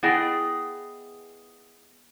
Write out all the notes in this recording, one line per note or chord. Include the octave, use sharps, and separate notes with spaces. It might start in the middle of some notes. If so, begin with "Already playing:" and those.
B3 E4 G#4 D#5 G5